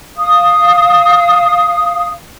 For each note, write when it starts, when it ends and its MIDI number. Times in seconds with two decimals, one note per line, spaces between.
0.17 2.09 77
0.17 2.09 87